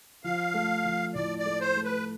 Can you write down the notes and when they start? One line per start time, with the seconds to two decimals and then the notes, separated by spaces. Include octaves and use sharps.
0.24 F3 F5
0.54 A3
0.85 F3
1.15 A2 D5
1.38 D5
1.46 A3
1.60 C5
1.76 A3
1.84 B4